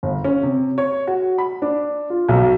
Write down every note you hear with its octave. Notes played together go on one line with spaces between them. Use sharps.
G1
C#4
C3
C#5
F#4
B5
D4
F4
B1